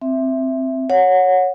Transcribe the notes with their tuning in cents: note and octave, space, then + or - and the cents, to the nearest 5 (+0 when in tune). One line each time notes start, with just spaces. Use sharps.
C4 +0 E5 +0
C#5 +0 F#5 -20